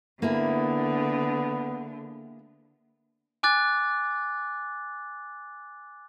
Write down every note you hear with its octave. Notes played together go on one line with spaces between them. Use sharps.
D3 A#3 B3 E4 G#4
G#5 D6 F#6 A6